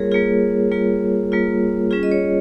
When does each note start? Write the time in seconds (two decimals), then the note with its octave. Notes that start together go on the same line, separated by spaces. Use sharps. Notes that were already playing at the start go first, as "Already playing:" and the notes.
Already playing: G3 A#3 F4 G#4 A#4 C#5
0.11 G3 A#3 F4 G#4
0.71 G3 A#3 F4
1.32 G3 A#3 F4
1.91 G3 C#4 F4 G#4
2.03 D#5
2.11 C#5